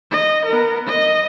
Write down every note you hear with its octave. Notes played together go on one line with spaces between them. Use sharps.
D#5
B3 A#4
D#5